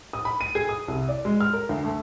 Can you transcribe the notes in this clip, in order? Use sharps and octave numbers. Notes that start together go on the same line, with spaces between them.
D#6
B5
D#7
G#4
D#6
C2
D5
G#3
F6
A#4
D2
A3